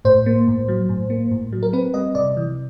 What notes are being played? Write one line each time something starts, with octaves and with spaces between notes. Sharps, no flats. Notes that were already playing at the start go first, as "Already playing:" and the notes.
A2 C5
A#3
A2
F#3
A2
A#3
A2
F#3
A#4
C4 B4
G3 D#5
C3 D5
E3